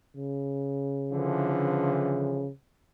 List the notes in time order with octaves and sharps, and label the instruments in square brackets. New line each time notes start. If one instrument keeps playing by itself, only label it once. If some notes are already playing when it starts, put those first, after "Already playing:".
[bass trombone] C#3
[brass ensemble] D3 E3 F3